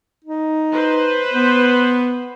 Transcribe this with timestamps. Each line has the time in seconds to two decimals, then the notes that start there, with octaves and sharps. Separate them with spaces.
0.25 D#4
0.72 B4 C5
1.32 B3